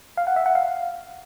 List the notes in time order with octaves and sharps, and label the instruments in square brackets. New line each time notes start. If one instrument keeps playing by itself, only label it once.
[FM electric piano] F5
F#5
E5
F#5
F5